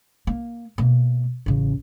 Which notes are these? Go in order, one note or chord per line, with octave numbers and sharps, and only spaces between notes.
A#3
B2 A#3
A1 C#3